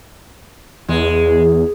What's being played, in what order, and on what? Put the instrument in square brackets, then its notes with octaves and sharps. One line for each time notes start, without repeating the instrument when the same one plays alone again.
[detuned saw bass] E2 [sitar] G#3